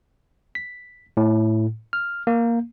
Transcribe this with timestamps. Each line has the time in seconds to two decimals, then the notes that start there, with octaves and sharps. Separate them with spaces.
0.55 B6
1.17 A2
1.93 F6
2.27 A#3